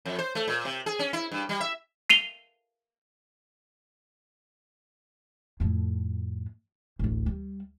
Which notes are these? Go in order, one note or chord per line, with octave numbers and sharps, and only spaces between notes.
F2
C5
A3
A#2
C3
G#4
C#4
E4
G2
G3
E5
C7 D#7 F7 G7
F2 A2
D1 A1
G3